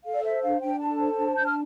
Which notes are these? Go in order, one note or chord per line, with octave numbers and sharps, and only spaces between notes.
A4 F5
D5
C5 E5
D4 F5
D4 G5
A4 A5
C5
D4
D4 G6
F6